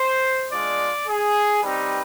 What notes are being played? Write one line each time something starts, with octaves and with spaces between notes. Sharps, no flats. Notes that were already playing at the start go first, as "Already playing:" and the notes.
Already playing: C5
G#3 D4 F4 D5
G#4
G3 C4 D#4 G4 B4